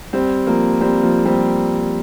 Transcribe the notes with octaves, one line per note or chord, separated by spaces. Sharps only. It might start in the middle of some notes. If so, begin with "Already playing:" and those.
G3 C4
F3 A#3
G3 C4
F3 A#3
G3 C4